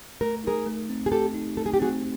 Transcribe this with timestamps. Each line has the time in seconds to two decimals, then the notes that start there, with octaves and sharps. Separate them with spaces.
0.21 A3 A#4
0.44 D#4 G#4 A#4
0.66 A3
0.89 C4
1.06 G#4
1.12 A3 G4 A4
1.34 D#4
1.57 A3 A4
1.66 G#4
1.74 G4
1.80 C4 F#4 G#4